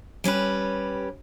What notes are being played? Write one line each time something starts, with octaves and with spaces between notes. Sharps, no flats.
G3 C#4 G4 B4